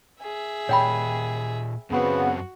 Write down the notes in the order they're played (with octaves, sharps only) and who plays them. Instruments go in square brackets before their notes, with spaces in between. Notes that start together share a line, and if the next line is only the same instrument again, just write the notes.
[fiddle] G#4 E5
[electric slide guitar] A#2 G4 [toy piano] C#5 G5 B5
[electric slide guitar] F#2 C4 C5 [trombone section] C#3 B3 [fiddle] F#4